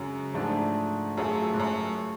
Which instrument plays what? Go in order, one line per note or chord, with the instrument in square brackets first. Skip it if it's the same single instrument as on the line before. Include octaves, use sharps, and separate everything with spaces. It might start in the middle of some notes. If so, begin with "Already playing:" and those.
Already playing: [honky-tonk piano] F#2 [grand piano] C#3 G#3 C#4 F#4
[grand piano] G#2 F3 A3 D4 G#4
[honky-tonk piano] F#2 [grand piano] F#3 A3 F4 G#4
[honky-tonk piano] G#2
F#2